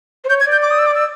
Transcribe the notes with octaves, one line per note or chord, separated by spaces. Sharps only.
C5
C#5 G6
G#6
D5
G6
D6
D#6
E6
D6
E6